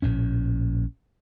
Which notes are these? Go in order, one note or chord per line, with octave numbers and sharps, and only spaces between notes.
A#1 A2 C#4